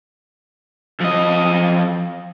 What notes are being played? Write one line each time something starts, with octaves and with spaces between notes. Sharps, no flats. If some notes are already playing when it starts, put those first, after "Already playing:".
F2 D#5